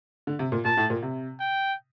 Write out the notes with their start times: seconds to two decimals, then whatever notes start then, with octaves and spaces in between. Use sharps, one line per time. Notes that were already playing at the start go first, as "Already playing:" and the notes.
0.27 D3
0.39 C3
0.52 A#2
0.65 A#2 A5
0.77 A2
0.90 A#2
1.02 C3
1.40 G5